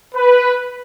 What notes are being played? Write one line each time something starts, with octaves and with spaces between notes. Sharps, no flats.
B4